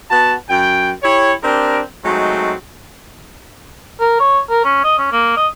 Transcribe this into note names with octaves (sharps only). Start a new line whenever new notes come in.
B3 F#4 A5
F#2 G5
E4 G4 C#5
C4 D4 G4 A#4
F#3 G#3 A3 C4 D#4
A#4
C#5
A#4
C#4
D#5
C#4
A#3
D#5